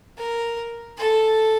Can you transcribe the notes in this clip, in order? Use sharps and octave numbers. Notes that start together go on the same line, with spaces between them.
A#4
A4